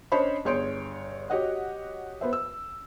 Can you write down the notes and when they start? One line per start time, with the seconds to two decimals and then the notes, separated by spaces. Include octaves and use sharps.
0.12 C#4 D4 C5 C#5 D#5 B5
0.45 G1 G#4 C#5 C6 G6 D7
1.30 F#4 G4 C#5 D#5 F#5
2.21 B3 C5 E5
2.33 E6